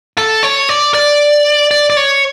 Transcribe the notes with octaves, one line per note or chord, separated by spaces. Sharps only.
A4
C#5
D5
D5
D5
D5
C#5